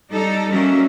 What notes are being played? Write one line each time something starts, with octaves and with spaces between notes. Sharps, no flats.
G3 D#4 A4
F#3 G3 A#3 C#4 A#4 E5